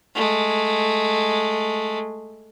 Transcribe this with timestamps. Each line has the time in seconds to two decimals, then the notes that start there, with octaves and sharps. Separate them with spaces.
0.15 G#3 A3